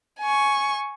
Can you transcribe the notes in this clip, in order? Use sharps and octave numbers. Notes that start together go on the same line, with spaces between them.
G#5 C#6